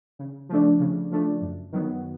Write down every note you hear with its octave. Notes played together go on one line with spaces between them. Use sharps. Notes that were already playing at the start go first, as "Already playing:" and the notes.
C#3
F3 A3 D4
C#3
F3 A3 D4
F#2
D#3 F#3 B3